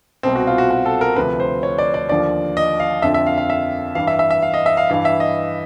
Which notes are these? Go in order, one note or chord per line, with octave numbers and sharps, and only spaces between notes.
C2 B2 C4
F#4
F4
F#4
F#4
A4
A#4
D2 C3 F3 B4
C5
C#5
D5
D5
D#2 D3 F3 D5
D#5
F5
F2 D3 F3 E5
E5
F5
F5
E5
G2 E3 F5
E5
E5
E5
F5
D#5
E5
F5
G2 E3 F5
E5
D#5